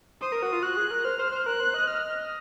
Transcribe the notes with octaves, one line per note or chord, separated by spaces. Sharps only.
C5 D#6
A#4
F#4
F4
F#4 F#6
G#4
A#4
C5 F6
C5
C5
A#4 F#6
C5
D#5
F6